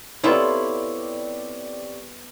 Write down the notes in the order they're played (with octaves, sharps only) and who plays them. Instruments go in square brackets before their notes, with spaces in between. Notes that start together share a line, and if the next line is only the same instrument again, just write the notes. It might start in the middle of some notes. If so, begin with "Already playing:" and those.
[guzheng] B3 F4 A4 [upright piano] C4 G4 D5 [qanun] E4 [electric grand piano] C#5